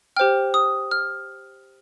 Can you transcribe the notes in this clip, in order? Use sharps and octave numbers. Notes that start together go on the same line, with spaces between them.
G4 C5 G5 F6
D#6
F6